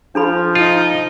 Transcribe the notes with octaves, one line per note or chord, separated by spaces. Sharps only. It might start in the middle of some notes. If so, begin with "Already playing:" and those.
F3 D4 A4 B5
D#4 F4